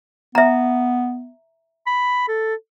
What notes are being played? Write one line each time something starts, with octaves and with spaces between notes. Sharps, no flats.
B3 E5 A#5
B5
A4